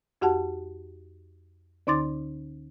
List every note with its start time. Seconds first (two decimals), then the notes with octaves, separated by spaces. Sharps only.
0.21 F2 F#4 G4 F#5 A5
1.87 D2 D3 D#4 C6 D6 A6